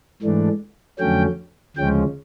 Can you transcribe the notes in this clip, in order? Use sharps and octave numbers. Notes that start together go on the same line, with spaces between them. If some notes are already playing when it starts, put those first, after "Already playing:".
G#2 E3 A3 D4
F2 D3 F#3 A3 C#4 G5
D2 C#3 F3 G#3 C#4 G5